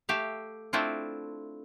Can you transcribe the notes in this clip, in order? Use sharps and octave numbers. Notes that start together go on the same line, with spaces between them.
A3 G4 E5 F5
A3 C4 D4 E4 F4